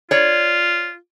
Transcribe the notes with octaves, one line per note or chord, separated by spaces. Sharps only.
F4 C#5 D5